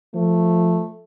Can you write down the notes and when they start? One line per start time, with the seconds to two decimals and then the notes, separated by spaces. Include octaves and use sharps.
0.15 F3 A3